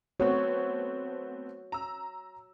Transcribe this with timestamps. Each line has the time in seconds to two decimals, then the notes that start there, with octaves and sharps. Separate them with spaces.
0.20 A3 B3 C4 F#4 C#5
1.72 A#5 E6